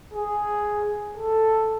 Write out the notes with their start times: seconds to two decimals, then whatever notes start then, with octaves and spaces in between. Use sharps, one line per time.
0.13 G#4
1.17 A4